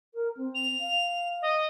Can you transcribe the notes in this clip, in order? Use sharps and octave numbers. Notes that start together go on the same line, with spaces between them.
A#4
C4
F7
F5
D#5